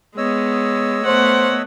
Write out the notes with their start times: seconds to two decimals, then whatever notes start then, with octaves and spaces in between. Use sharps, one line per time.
0.18 G#3 B3 C#5 D#5 E6
1.06 A3 B3 C5 F#5